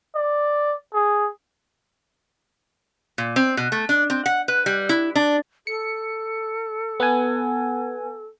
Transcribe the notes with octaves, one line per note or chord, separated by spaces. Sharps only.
D5
G#4
A#2
C4
B2
A3
D4
C4
F#5
B4
G3
E4
D4
A4 C#7
B3 F#5 G#5